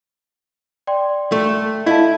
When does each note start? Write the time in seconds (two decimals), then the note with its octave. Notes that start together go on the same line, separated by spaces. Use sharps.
0.87 D5 G5 C6
1.32 A3
1.86 E4 D#5 F5 A5